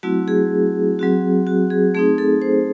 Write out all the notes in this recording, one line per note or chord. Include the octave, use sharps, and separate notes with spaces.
F#3 A3 C4 E4 F#4
G#4
F#3 C4 F#4
F#4
G#4
A3 C4 D#4 G#4
A4
C5